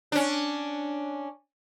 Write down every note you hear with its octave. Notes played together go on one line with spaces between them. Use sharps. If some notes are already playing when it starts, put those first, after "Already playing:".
C#4 D4